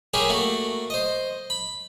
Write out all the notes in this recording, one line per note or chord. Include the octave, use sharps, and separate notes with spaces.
E4 G4 G#4 A#4 C#5
A3 A#3 F#4
C5 D#5
B5